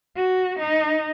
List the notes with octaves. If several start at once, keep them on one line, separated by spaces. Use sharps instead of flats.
F#4
D#4